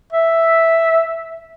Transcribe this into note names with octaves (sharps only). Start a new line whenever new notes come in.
E5